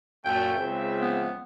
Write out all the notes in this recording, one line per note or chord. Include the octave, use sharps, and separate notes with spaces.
F#2 A#2 A3 G5
C#2 C4 E5
B3